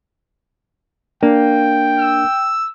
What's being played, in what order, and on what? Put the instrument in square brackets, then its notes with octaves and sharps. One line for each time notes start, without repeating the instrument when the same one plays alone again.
[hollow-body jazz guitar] A#3 [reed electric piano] D4 [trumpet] G5
[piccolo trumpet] E6